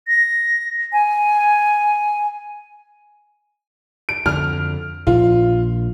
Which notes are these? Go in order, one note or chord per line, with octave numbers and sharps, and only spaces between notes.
A#6
G#5
D7
F2 D3 F6
A#1 F4